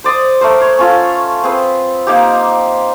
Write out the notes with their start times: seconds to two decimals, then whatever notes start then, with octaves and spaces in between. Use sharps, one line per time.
0.04 C5 D5 C6 D#6
0.41 A3 A#4 C5
0.61 C#5
0.78 C#4 F4 A4
1.43 C4 G#4 B4
2.07 A#3 D#4 G4